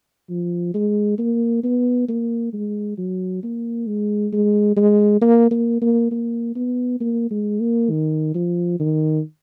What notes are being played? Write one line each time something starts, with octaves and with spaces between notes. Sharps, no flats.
F3
G#3
A#3
B3
A#3
G#3
F#3
A#3
G#3
G#3
G#3
A#3
A#3
A#3
A#3
B3
A#3
G#3
A#3
D#3
F3
D#3